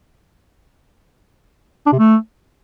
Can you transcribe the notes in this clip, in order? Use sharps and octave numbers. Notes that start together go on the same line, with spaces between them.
D4
C3
A3